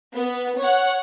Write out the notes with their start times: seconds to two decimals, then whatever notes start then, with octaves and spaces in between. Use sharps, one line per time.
0.14 B3
0.58 C#5 F#5